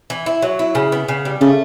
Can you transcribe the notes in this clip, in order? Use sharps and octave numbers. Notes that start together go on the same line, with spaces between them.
E3
E4
F#3
E4
C#3
B3
C#3
G3
C#3 A3